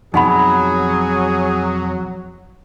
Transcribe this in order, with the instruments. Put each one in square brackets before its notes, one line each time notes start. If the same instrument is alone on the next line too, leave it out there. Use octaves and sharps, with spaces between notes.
[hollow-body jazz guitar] F2 B2 [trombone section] F#3 [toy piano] D#4 F#5 B5 [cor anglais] G#4